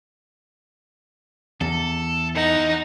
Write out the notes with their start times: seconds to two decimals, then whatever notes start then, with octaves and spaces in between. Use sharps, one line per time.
1.61 E2 A4
2.36 E3 D#4 F#5